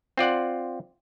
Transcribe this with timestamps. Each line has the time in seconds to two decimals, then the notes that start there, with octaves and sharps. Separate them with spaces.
0.17 C4 F4 D5 F#5